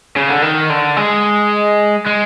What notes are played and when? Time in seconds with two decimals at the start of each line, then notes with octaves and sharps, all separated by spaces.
0.16 C#3
0.29 D3
0.42 D#3
0.70 D3
0.97 G#3
2.06 G#3